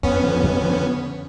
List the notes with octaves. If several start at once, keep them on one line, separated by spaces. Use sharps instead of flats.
F2 B3 C#4
D3 F3
F2
D3 F3